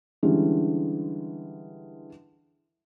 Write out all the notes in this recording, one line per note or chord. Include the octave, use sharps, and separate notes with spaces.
D3 E3 G3 G#3 C#4